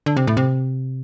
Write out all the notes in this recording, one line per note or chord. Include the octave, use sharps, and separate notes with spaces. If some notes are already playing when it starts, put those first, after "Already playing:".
D3
C3
A2
C3